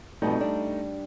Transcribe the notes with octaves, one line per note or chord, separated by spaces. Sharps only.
F2 B2 G3 A3 D#4
G3 D4